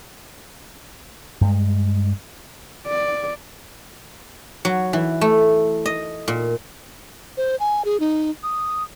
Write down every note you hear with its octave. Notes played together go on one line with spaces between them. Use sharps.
G2 G#3
D5
F#3
E3
A3
D#5
A#2
C5
G#5
G#4
D#4
D#6